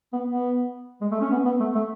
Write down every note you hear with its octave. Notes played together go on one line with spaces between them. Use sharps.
B3
B3
G#3
A3
C#4
B3
B3
A3
A3